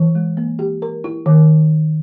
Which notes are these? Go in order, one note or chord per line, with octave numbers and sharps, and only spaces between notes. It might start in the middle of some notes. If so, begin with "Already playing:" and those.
Already playing: E3
G#3
A#3
G4
A#4
E4
D#3